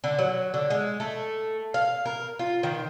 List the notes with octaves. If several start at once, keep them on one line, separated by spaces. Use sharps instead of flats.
D3
F#3
D3
G#3
A3
F5
A#4
F4
D#3